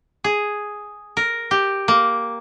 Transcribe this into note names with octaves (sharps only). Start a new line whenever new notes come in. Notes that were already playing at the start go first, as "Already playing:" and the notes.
G#4
A#4
G4
A#3